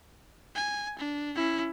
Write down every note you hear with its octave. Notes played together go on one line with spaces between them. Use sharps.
G#5
D4
C#4 E4